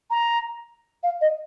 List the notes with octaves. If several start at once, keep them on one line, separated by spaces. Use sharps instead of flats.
A#5
F5
D#5